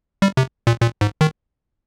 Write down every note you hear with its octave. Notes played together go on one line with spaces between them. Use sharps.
G3
C3
A#2
A#2
G#2
D#3